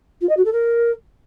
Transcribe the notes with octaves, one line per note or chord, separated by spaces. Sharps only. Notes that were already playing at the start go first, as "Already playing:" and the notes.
F4
D#5
F#4
A4
A#4